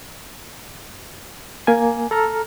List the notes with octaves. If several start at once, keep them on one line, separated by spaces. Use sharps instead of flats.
A#3 G#5
A4 A#5 F6